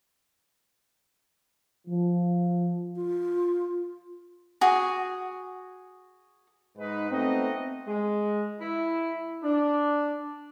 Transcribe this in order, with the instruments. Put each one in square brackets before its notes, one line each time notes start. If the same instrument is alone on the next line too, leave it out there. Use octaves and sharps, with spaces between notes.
[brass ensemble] F3
[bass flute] F4
[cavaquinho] F#4 G#4
[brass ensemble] G#2 D#4 B4
A3 B3 C4 D#4 F#4 D#5
[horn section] G#3
E4
D4